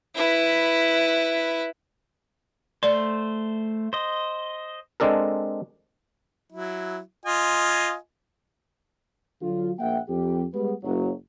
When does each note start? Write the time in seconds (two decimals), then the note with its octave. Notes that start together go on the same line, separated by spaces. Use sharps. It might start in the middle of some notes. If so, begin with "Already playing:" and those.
0.15 E4 B4
2.83 A3 C5 D5
3.93 C5 D#5
5.00 G#3 C4 D4 A4 A#4
6.52 F#3 E4
7.25 F4 D#5 G#5
9.41 D3 F#3 F4
9.79 A#1 A#3 E5 F#5 G5
10.09 F2 G4
10.54 G3 G#3 B3
10.84 F#1 F#3